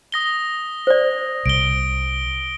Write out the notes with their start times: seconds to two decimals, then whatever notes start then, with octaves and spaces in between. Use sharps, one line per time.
0.12 D#6 A#6 G7
0.87 C5 D5
1.46 C2 D7 G7